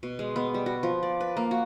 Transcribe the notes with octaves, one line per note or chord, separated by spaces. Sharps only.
B2
G#3
B3
G3
F#4
F3
D5
B4
A#3
F#4